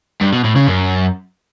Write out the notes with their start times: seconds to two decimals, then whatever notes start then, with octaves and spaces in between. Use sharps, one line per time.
0.21 G2
0.33 B2
0.44 A2
0.56 C#3
0.67 F#2